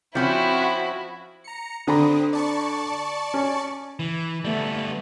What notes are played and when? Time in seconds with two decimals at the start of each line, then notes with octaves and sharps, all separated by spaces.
0.15 F3 C4 C#4 E4 F#4 B5
1.44 A#5 C#7
1.87 D3 C4 A#5 B5 D#6
2.33 D5 A5 C#6
3.34 C#4
3.99 E3
4.44 G3 A3 B3